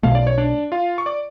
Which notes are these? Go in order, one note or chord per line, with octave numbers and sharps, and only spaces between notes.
B1 B2 A3 F5
D5
C#5
D4 D5
F4 F5
C#6
D5 D6